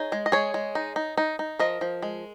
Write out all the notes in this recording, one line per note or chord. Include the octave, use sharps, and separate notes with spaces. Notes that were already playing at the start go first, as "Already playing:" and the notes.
Already playing: D#4 G#4 C#5
G#3
D#5
G#3 G#4 C#5
G#3
D#4
D#4
D#4
D#4
F3 A#4 D#5
F3
G#3